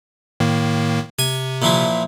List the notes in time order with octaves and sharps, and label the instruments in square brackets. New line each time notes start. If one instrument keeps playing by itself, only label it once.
[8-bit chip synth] A2 D#3 A#3
[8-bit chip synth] C3 [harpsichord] G#5
[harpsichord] A#2 E3 F3